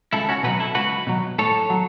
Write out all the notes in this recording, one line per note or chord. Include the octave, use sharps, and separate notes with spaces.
C#2 E4 A4
C#4 F#4
B2 F#3 F#4 B4
E4 A4
C#2 F#4 B4
B2 F#3
A2 A4 C#5
F#3